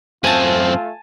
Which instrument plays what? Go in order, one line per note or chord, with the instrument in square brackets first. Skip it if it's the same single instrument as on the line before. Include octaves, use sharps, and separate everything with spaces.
[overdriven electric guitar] F#2 C4 [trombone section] A3 F4 [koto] G#5 A5